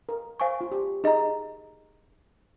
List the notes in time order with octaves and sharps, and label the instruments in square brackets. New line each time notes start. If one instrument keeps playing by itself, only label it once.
[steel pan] A#4
[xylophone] C5 F5 G#5 C#6
[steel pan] F4
G4
[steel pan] D#4 [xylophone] G#4 D#5 A#5